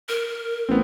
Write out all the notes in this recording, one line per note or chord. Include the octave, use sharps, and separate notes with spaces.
A#4
A1 B3 C4